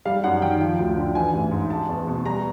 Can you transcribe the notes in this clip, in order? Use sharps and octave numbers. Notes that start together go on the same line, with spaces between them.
G3 F5
F#2 F#5
D#3 G5
F3 G5
D2
D3
E3 G#5
A1
G#2
G#3 A5
E2
B2
G3 A#5